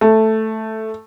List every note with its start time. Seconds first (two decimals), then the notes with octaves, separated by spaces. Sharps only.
0.01 A3